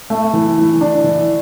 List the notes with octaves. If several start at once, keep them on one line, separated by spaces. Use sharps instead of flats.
A3
E3
E3
D4
E3